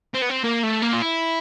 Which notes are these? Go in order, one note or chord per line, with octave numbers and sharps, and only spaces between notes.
C4
B3
C4
A#3
A3
A#3
F4
E4